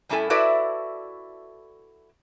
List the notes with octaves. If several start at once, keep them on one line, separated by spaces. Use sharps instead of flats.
A2 G3 C#4 E4 A4 G#5
E4 F#4 A4 B4 D5 E5